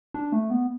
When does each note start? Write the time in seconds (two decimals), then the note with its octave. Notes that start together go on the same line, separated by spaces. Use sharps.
0.14 D4
0.32 A3
0.50 B3